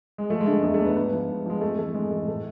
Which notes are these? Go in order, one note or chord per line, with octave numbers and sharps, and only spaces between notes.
G#3
F3 A3
G#3
D3 A3
E2 G#3
A3
E2
B3
G#2 B3
F3
G#2
F3 G#3
F2 A3
E3 A3
F2 G#3
E3 A3
A2 A3